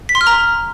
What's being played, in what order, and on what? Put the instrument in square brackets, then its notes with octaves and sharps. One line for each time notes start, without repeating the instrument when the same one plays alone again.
[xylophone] B6
C6
F6
A#5